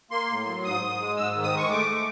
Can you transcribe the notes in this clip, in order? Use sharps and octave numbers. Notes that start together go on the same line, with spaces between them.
A#3 C6
A2
F#3
G#2 D#6
G#2
G#3
G#2 E6
D#3
D#6
G#3
C#6
A3 D6
A3